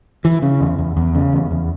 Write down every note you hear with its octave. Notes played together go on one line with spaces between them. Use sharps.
E3
C#3
E2
E2
E2
C#3
E2
E2